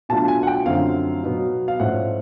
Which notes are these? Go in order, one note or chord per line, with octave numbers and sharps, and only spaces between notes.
B2 F#3 A3 D4 F4 A5
G#5
F#5
G5
F#2 D3 F3 A3 C4 F5
B2 F#3 B3 D#4
F5
G#2 F3 A3 C#4 E4 F#5